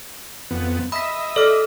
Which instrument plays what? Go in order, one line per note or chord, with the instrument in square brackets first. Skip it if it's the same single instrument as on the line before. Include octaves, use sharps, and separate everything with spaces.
[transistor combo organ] F2 B3
[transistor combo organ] D#5 E5 [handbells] B5 B6
[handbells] A4 F6 [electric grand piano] D5